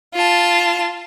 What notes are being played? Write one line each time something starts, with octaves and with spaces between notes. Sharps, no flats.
F4 A5